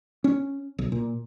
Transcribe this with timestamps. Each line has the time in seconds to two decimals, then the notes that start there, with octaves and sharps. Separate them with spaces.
0.24 C#4
0.79 B1
0.92 A#2